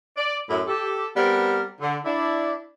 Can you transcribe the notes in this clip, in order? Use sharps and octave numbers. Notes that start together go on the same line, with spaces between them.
D5
F#2 A2 E4
G4 A4
G3 B3 C4 A#4
D3
D4 E4